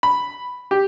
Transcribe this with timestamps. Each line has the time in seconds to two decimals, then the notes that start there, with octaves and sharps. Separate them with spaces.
0.03 B5
0.71 G4